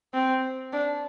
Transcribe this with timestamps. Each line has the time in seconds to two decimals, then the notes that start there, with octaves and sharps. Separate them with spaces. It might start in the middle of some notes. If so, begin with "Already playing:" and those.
0.14 C4
0.73 D4